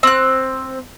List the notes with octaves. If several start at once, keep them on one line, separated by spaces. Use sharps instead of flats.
C4 F#6